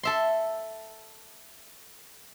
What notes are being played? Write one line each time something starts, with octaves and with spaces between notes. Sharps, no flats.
A4 E5 C6